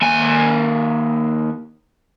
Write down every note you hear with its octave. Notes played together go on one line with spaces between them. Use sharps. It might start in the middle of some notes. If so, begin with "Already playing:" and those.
D#2 G#5